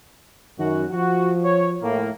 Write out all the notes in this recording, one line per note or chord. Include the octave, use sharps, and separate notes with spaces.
F#2 D#3 F#4
F3 F#4
C#5
A2 A#3